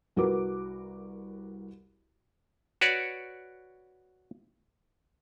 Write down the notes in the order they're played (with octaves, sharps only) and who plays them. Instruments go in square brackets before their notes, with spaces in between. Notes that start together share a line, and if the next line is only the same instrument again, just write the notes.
[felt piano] C2 F#4 A#4 B4 D6
[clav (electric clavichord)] F#4 B4 C#5 D5